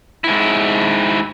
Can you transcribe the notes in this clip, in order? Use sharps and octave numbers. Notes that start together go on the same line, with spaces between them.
G#2 E4